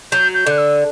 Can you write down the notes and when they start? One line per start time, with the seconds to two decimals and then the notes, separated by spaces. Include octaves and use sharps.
0.12 F#3 G6
0.34 G6
0.46 D3 F#6
0.58 E6